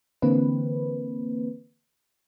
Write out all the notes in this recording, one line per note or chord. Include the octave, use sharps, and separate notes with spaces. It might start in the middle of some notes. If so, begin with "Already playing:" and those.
D3 E3 A#3 C4 B4